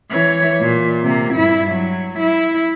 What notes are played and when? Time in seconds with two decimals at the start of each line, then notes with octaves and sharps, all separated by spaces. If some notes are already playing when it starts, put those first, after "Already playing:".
0.10 E3 C#5
0.60 A#2
1.03 C3 A#3
1.34 G2 E4
1.71 F#3
2.19 E4